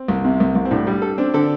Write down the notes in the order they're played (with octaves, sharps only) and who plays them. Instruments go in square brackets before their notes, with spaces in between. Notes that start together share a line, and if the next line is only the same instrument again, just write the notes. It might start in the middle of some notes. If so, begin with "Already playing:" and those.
Already playing: [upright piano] C4
[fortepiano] C2
C3
C2
C2
[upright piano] C4
[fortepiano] A2 [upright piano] D4
[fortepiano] G3
A4
[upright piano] C4 [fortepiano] D4
[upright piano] D3 [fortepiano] A4